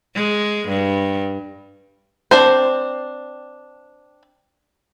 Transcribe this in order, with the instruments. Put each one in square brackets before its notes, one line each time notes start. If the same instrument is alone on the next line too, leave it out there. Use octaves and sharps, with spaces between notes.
[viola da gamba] G#3
G2
[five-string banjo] C4 D4 C5